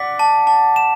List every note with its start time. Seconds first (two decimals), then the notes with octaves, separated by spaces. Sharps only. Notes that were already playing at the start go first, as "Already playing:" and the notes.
Already playing: D5 F#5 D6 B6
0.19 A5
0.47 A5
0.76 E7